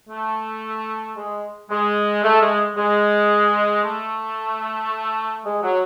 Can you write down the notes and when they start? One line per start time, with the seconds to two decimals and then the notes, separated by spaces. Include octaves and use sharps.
0.10 A3
1.16 G#3
1.71 G#3
2.24 A3
2.41 G#3
2.77 G#3
3.84 A3
5.44 G#3
5.62 F#3